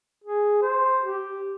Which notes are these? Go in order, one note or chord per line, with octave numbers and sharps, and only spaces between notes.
G#4
C5
G4